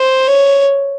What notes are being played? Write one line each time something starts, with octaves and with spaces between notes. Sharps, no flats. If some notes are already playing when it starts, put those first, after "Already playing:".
Already playing: C5
C#5